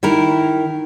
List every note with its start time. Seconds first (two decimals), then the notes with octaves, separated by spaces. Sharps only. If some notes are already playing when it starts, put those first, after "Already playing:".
0.03 D#3 E4 A#4